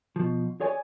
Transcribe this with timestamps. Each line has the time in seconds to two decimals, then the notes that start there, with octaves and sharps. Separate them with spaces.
0.16 B2 F3
0.60 G#4 C#5 D5 G#5